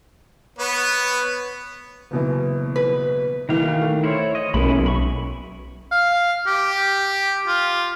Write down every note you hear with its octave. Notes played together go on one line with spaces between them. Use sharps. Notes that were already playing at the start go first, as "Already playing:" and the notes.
B3 B4 C#5
F#1 B2 E3
B4
B1 D#3 E3 F5
A3
E4 C5 C#5
D#5
B1 G#3 A#3 C#4 E4 B5
B5 C#6
F5
G4
F4